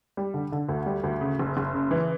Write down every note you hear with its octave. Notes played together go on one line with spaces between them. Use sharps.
G3
D3
D3
D2
G3
D2
C#3
F#1
F#1
C#3
E3